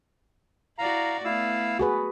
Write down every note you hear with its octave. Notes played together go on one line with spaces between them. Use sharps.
E4 F#4 D5 F5 A#5
A3 B3 E4 F5 E6
F#4 G#4 B4